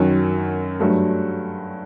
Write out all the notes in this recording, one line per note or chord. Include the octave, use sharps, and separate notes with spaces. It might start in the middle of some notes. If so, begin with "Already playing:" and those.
Already playing: F#2 D#3 F#3
G2 F#3 A3